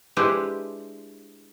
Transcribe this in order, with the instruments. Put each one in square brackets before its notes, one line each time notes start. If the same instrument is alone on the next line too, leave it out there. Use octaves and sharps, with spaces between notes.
[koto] G#3 D4 E4 G4 B4 C5